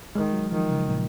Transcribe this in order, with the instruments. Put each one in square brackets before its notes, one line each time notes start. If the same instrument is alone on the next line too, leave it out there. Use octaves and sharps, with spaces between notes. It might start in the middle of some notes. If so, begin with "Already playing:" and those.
[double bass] D#3 [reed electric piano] G#3
[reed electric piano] F#3
[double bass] D#3 [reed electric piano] F3
[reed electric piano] C#3
A#2